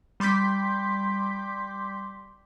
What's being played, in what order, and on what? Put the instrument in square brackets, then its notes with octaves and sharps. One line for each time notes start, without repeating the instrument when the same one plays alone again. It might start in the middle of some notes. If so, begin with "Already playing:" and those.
[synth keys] G3 C6 D6 G6 B6